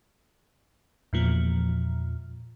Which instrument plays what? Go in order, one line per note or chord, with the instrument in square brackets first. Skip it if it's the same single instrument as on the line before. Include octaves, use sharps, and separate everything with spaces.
[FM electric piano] E2 A#2 F3